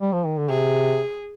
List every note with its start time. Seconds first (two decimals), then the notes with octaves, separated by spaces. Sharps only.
0.01 G3
0.13 F3
0.26 D#3
0.38 D3
0.50 C3 G#4